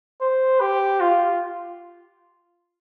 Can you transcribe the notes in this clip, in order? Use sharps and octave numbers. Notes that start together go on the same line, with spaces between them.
C5
G4
F4